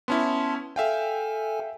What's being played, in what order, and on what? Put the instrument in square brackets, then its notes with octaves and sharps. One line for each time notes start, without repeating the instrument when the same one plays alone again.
[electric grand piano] B3 C#4 E4 [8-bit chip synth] A5 C6
[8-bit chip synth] A4 G#5 [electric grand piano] E5 F5 G5